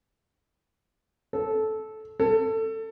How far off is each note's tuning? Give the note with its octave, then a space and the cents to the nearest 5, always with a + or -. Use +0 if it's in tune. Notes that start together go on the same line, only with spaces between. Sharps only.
A4 -15
A4 +20